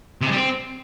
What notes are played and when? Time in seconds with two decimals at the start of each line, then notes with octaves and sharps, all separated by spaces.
0.21 C3
0.26 G#3
0.31 G3
0.36 C4